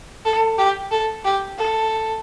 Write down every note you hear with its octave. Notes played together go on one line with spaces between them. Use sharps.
A4
G4
A4
G4
A4